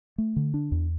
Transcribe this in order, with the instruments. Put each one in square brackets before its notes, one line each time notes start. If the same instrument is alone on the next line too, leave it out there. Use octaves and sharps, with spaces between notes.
[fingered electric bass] A3
D3
D4
E2